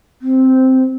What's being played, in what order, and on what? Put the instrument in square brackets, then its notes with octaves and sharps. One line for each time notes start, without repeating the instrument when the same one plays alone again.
[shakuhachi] C4